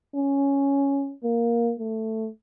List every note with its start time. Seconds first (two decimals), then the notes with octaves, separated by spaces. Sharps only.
0.15 C#4
1.23 A#3
1.79 A3